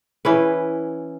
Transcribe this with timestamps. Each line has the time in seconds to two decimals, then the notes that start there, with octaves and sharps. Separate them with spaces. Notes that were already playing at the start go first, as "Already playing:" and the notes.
0.25 E3 C#4 B4